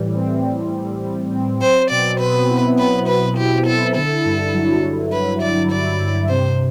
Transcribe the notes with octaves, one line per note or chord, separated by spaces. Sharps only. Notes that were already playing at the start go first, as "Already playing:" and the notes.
Already playing: A2 E3 G3
C4
E3
A2
G3
C4
F#3 C5
B2 D5
B3 B4
E4
F#3 B4
B2 B4
B3 G4
E4 A4
D3 A4
G2
F#3
G2
D3 B4
G2 D5
F#3 D5
G2
C3 C5